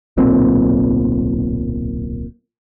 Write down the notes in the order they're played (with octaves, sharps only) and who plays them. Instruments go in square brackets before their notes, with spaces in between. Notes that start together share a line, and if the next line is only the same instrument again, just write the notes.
[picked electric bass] D1 B1 A#2 C4